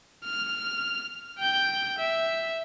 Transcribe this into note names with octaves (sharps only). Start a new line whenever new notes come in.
F6
G5 G6
E5